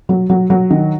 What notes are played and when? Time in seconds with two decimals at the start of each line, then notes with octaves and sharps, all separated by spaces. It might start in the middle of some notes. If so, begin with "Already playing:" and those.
0.09 F#3
0.30 F#3
0.50 F#3
0.70 D#3